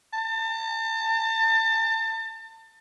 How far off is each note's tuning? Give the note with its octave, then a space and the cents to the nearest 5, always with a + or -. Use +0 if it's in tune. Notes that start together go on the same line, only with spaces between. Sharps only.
A5 +35